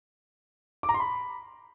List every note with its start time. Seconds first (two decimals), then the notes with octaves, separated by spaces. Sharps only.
0.83 D6
0.89 A#5
0.94 C6
1.00 B5